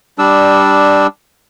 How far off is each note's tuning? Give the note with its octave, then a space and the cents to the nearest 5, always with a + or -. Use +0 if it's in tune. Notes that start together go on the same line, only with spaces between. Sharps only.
G3 +5 D4 +0 E6 -15